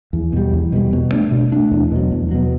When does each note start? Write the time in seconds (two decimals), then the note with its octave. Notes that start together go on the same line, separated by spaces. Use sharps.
0.13 E2
0.33 B2 G3
0.53 E2
0.72 B2 G3
0.93 B2
1.13 A3 D4
1.32 B2
1.52 A3 D4
1.71 E2
1.92 B2 F#3
2.12 E2
2.31 B2 F#3